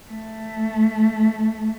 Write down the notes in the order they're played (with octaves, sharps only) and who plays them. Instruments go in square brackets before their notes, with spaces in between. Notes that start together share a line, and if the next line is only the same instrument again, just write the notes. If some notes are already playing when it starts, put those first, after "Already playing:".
[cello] A3